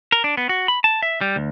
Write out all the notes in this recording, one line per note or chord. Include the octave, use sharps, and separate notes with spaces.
A#4
D4
B3
F#4
B5
A5
E5
G3
D2